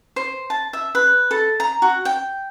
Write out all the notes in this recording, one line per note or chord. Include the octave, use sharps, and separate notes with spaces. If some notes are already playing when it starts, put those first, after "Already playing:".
C5
A5
E5
B4
A4
A#5
F#4
G5